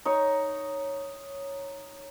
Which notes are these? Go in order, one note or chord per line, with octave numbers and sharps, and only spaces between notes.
D#4 C#5